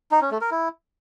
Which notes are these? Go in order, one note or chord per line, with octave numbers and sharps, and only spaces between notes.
D#4
C#4
A3
A#4
E4